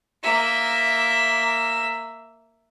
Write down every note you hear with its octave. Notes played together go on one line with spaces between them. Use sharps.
A#3 E5